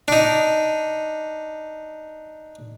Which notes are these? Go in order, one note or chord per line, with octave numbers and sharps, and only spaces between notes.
D4 D#4